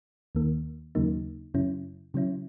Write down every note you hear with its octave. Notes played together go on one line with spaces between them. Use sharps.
D#2 D#3 A#3
D#2 C#3 F#3 A#3 D#4
F#2 C#3 F#3 C#4 E4
C#3 F#3 C#4 E4